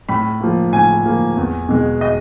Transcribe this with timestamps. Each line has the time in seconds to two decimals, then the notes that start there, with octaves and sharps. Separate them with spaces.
0.09 A2 B5
0.41 F3 A#3
0.73 A2 G#5
1.05 F3 A#3
1.37 E2
1.69 B2 G#3
2.01 D#5